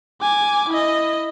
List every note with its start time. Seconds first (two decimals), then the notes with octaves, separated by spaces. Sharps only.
0.22 G#5 D6
0.69 E4 D#5